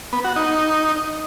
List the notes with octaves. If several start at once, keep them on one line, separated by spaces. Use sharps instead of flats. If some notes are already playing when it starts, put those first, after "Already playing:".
B3
F#4
D#4